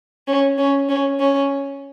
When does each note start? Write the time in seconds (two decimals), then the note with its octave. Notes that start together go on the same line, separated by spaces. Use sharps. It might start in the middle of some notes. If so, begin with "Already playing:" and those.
0.27 C#4
0.58 C#4
0.89 C#4
1.20 C#4